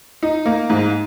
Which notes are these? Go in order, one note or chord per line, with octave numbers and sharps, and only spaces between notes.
D#4
A#3
G#2